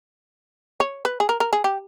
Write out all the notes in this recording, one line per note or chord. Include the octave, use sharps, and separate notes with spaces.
C#5
B4
G#4
A#4
A#4
G#4
G4